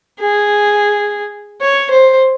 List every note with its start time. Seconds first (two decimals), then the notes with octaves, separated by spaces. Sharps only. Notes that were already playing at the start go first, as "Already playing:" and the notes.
0.19 G#4
1.61 C#5
1.91 C5